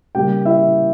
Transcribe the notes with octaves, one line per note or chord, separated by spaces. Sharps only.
C#3 G3 A#3 G4 G5
E4 E5